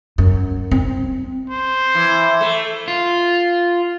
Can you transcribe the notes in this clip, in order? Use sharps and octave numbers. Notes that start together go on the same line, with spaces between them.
F#2
C4
C5
E3
A3
F4